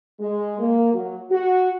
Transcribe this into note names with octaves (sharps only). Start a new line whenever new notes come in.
G#3
A#3
F#3
F#4